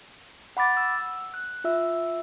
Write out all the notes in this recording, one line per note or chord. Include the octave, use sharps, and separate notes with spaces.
F#5 B5 D6 A6
E6
F#6
F4 E5 E6